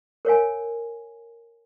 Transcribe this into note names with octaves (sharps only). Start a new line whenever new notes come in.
A#4 C#5 F5 G#5